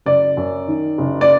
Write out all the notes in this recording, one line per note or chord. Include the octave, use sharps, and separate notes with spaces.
F#1 D5
F#2
D#3
F#1
D5